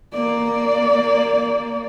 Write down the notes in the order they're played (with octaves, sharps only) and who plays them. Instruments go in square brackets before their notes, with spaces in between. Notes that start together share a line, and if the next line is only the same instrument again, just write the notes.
[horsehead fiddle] A#3 D5